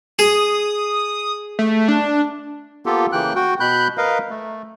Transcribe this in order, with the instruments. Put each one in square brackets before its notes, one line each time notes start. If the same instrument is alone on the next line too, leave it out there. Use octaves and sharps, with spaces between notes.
[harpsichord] G#4 [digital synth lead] D#6
[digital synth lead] A3
D4
[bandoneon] A#3 B3 F4 G4 A4
C#3 E3 A#3 G5 F#6
F#4 G5
B2 B5 F#6 G6
A#4 B4 D#5 F5
A3